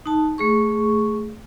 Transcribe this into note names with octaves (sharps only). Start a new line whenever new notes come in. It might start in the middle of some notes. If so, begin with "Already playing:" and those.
D#4 A5
A3 G#4 C#6